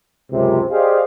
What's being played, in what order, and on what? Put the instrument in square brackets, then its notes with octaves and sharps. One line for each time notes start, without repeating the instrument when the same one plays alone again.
[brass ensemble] C#2 F#2 C3
G4 G#4 C5 D5 D#5 F5